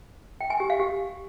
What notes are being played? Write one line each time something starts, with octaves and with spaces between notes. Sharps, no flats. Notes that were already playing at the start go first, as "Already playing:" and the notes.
G5
G#5
G4
F5
G4